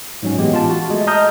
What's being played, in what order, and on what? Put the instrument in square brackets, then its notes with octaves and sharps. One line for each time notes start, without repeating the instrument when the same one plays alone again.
[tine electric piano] G#2 F#3 C#4
A2 E3 G#3 B3 G4
F4 A5
F#4
G#3 A3
D#5 A5 A#5 D#6 F6 G6